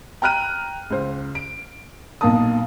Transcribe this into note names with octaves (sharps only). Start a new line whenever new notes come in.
G5 A#5 F6 F#6 D#7
C#2 C5
D7
B1 A#2 A#3 F5 A5 D#6